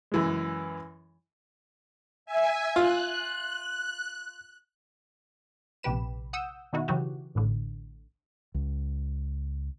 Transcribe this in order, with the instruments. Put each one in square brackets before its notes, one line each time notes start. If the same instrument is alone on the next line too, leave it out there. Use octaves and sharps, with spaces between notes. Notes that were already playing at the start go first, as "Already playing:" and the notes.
[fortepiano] F#2 E3 G#3
[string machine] E5 G#5
[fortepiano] F4 [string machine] F#6
[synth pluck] A#1 C3 G4 B4 E7
F#5 D#6 E6 G6
B2 D#3 D#4 E4 F#4
C#3 E3 F#3 F#4 G4
A1 A2 D3
[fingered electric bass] C#2